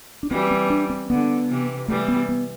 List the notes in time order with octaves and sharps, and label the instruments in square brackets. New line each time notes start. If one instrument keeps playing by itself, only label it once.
[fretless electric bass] D4
[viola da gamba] E3 G3 [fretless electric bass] C4
[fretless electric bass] C4
D4
C4
[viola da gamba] D3 [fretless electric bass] B3
[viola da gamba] C3 E3
[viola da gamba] E3 G3 [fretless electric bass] A3
[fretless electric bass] B3
B3